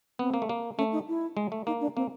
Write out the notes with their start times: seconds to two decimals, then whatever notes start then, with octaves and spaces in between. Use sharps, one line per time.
0.19 B3 C4
0.34 A#3
0.42 A3
0.49 A#3
0.78 A3 C#4
0.92 D#4
1.08 E4
1.37 G#3
1.52 A3
1.67 A#3 D#4
1.81 D4
1.96 A#3 C4